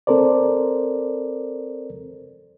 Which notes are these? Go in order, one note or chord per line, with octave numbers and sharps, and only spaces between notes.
C4 A4 A#4 C5 D5